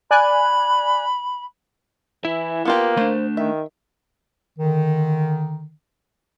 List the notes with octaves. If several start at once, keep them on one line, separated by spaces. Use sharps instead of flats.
D5 G#5 B5 F#6
E3 E4 E5
A#3 B3 F4 G4
A3 D4 C5
D#3 E5
D3 D#3